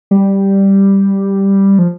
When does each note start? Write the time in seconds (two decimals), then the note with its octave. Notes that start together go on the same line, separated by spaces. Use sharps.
0.11 G3
1.79 F3